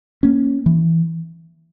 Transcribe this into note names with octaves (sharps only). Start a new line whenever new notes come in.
A#3 C#4
E3